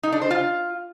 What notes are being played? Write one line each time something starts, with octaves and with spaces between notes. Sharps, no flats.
D#4
D4
C5
F4